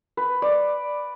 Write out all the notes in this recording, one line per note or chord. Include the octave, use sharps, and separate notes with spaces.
B4
D5